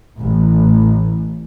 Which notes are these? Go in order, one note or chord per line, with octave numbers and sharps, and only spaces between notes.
A1